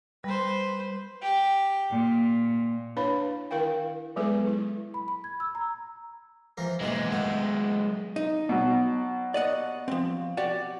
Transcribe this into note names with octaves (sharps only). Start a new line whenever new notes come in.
G3 B4 C5
G4
A#2
D4 E4 B4 C#5 F5 B5
D#3 E4 A#4 F5 G5
F#3 G#3 B3 G#4 A4 B4
E4
B5
B5
G#6
E6
A#5
E3 F3 A#4
F#2 B2 E3 G#3 A#3
D#3 A3 B3
D#4
B2 F#3
D5 D#5 F#5
F3 C4
F#4 G4 D5